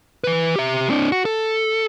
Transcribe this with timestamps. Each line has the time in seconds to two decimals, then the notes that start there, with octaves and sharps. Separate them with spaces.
0.24 E3 B4
0.56 G4 E5
0.90 C4 D4
1.12 F#4
1.25 A4